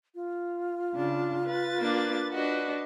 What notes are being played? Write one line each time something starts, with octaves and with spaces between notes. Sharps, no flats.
F4
C#3 D4 A5
B4 A6
A#3 D4
D4 F#4 B4 D#5